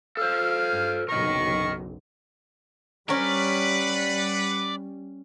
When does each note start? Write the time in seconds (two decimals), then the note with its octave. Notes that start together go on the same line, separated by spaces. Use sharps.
0.17 A4 C5 F5
0.70 G2
1.09 F#1 B1 C3 A#4 D#5 C#6
3.09 G3 C#4 A#4 B4 D5 F#5 B5